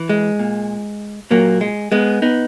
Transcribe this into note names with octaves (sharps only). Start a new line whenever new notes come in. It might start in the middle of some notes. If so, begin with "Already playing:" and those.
Already playing: E3
G#3
A#2
A#2 F#3 A#3
G#3
G#3 B3
B3 D#4